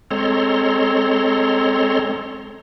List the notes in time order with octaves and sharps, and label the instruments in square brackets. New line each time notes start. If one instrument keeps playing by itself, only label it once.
[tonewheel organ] G#3 C4 A4 C#5 A#5 C6